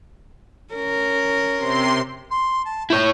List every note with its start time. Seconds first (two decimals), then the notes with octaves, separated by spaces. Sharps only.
0.74 C#4 A#4
1.57 C3 C6
2.30 C6
2.65 A5
2.90 E4 C#5 G6